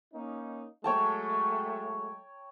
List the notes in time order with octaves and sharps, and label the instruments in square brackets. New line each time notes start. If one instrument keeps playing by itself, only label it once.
[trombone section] A#3 C#4 D#4
[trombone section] F#3 G#3 A3 [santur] C#5 G5 A5